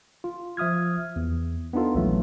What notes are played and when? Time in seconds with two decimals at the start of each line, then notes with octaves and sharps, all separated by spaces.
0.24 F4
0.57 F3 E5 D#6 F6 G#6
1.16 E2
1.73 B3 D4 D#4 F4 A4
1.95 A#1 D#2 E3 F#3 A3